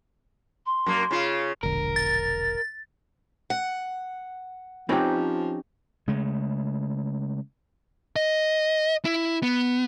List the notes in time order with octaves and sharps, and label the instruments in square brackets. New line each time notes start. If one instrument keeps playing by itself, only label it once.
[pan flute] C6
[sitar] F#2 A#3
C#3 F4
[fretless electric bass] E1 A#1 D3 [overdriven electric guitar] A#4
[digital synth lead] A6
[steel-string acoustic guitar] F#5
[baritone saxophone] F3 [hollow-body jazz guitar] C4 D#4 B4 [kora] C#4 G4
[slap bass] C#3 G#3 A3
[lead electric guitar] D#5
E4
B3